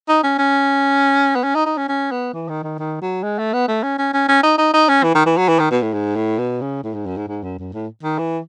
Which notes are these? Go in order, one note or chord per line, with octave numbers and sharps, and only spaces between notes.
D#4
C#4
C#4
B3
C#4
D#4
D#4
C#4
C#4
B3
E3
D#3
D#3
D#3
F#3
G#3
A3
B3
A3
C#4
C#4
C#4
C#4
D#4
D#4
D#4
C#4
E3
D#3
E3
F#3
E3
D#3
B2
A2
G#2
A2
B2
C#3
A2
G#2
F#2
G#2
G#2
F#2
F#2
A2
D#3
E3